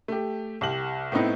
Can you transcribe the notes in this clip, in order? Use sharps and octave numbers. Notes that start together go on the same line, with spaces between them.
A3 G4
C2 G4 F#7
A2 B3 C4 D#4 E4